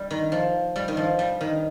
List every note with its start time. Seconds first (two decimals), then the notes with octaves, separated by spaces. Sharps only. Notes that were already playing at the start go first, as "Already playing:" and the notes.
Already playing: G3
0.11 D#3
0.32 F3
0.76 G3
0.88 D#3
0.97 F3
1.19 G3
1.41 D#3